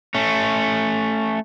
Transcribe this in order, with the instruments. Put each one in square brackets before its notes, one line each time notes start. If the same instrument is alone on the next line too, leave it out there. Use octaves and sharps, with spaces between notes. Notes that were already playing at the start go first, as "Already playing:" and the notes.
[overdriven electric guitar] A3 C#4